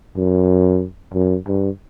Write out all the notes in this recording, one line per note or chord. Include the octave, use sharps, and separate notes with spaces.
F#2
F#2
G2